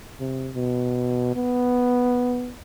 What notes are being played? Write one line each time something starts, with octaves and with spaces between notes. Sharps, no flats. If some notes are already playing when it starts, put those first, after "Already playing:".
C3
B2
B3